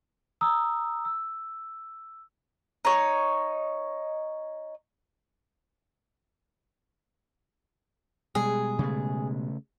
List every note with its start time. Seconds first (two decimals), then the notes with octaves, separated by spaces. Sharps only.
0.41 A#5 D#6 E6
1.05 E6
2.85 D#4 C#5
8.35 B2 G3 G#3 G#4
8.79 C#3 A3